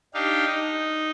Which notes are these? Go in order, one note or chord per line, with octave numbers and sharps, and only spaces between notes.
D4 D#4 G4 F5
D#4